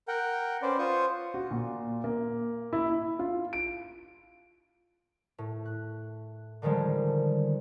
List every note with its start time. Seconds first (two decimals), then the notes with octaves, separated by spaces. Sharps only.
0.08 A#4 F#5 G5
0.62 C#4 B4 C5 D5
0.79 F4 C5 C#6 D#6
1.34 F#4
1.51 A#2
2.04 A#3
2.73 E4
2.89 E4
3.19 F4
3.53 D7
5.38 A2
5.65 F#6
6.62 D3 D#3 F3 G3 G#3